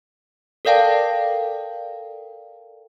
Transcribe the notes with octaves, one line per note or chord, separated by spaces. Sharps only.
A4 A#4 D5 F5 G5 A5